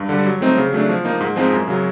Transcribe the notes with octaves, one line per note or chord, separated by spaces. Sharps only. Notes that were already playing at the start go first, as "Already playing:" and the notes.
Already playing: G2
D3 G3
F#3
A3 C4 D#4
C#3
F#3 A3 D4
F3
A#3 D#4
G#2
F3 G#3 C4 D#4
F#2
C#3 F#3